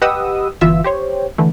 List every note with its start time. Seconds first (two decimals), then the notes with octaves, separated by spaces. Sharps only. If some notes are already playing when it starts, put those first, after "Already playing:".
0.02 G4 B4 D#5 F#5 D#6 E6
0.61 G1 E3 F4 E5 E6
0.84 G4 C5 C#5
1.38 D3 E3 A3